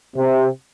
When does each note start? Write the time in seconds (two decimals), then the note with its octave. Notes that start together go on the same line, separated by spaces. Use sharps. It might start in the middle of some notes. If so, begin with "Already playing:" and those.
0.16 C3